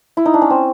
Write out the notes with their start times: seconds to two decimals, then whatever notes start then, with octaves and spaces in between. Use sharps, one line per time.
0.17 E4
0.26 D#4
0.34 D4
0.42 C#4
0.50 C4